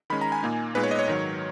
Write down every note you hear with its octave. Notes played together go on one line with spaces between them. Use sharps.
D#3 G#3 C#4 B5
A#5
G#5
A#2 A#3 D#4
A#2 G#3 B3 D#4 B4
C#5
D#5
C#5
G#2 D#3 F#3